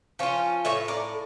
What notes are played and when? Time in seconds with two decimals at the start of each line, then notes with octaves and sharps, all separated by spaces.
0.19 F3 C#4 F4
0.65 A2 C#5 E5
0.88 A#4 D5